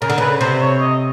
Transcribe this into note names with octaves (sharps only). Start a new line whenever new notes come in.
C#3 A#4
D3
C#3 B4
C3 C5
C#5
D#5